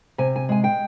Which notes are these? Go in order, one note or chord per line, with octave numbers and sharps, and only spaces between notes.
C3 G#5
G#5
G#3 G#5
G5